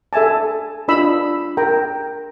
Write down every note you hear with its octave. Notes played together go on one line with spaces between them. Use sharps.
A4 E5 G#5 A5
D4 F4 D#5 B5 E6
A#4 G5 A#5